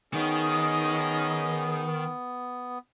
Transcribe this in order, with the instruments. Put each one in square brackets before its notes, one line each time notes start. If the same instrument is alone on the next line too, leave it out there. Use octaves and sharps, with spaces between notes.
[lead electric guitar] D#3 [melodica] B3 [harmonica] C#4 G#4 D#5